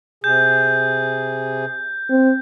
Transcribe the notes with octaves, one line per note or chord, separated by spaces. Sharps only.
C3 G#4 G6
C4